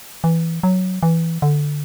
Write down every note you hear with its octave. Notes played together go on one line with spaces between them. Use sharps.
E3
F#3
E3
D3